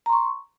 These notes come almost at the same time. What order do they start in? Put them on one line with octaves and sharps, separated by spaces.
A#5 C6 C#6